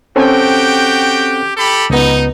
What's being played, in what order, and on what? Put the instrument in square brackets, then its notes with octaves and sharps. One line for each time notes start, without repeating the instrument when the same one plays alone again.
[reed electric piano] C4 C#4 A4 [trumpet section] F#4 G4 G5
[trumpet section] G4 A4 B5
[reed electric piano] C#2 B3 [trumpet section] D#4